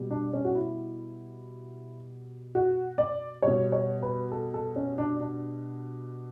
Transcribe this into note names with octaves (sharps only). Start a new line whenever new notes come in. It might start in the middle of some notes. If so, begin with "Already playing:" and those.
Already playing: B2 G3
D4
C#4
F#4
E4
F#4
D5
B2 G3 C#5
C#5
B4
A4
A4
C#4
D4
D4